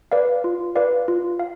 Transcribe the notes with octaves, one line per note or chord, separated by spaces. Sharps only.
B4 D5 F5
F4
B4 D5 F5
F4
F5